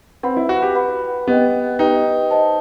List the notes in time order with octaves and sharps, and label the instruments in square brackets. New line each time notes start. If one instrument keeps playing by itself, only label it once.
[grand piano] C4 [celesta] B4 F#5 B5
[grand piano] E4
F#4
G4
[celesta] B4 F#5 B5
[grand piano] B3 [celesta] G4 B4 D#5 G5
[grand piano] D#4 [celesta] G4 B4 D#5 G5
[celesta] C5 D#5 A5